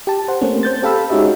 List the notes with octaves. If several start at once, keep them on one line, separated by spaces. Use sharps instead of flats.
G4 A5
C5 F#5
A3 A#3 C4 C#4
C5 G6 A6
G4 A4 F5 B5 E6
G#3 C#4 D#4 F#4 G4 E5